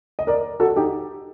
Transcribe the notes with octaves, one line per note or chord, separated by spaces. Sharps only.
D#5
A#4 D5
F#4 A4
D#4 G4